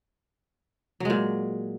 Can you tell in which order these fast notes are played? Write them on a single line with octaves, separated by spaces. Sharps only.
F#3 G#3 A#2